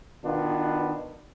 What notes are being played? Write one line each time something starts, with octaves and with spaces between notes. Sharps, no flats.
B2 D#3 B3 D4 F4